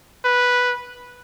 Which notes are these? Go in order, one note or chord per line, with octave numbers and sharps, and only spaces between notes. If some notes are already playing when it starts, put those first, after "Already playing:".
B4